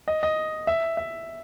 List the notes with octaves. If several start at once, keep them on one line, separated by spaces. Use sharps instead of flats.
D#5
D#5
E5
E5